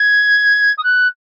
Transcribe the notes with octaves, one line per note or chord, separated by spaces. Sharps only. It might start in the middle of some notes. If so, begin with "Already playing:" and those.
Already playing: G#6
D#6
F#6